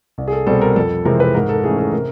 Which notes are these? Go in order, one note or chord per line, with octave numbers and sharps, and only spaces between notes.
C2
G#4
A4
B2 G3 C4 A4
A#4
F2 A4
C3 E3 G#3 C4 A#4
B4
G#2 A#4
A4
E3 A3 C#4 G#4
A4
C3 A#4